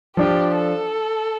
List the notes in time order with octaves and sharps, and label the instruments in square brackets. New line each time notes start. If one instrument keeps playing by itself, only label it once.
[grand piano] F3 D4 F4 [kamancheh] G4
[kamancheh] A4